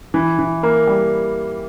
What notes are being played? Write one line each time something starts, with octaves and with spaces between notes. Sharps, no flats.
E3
E3
A#3
G3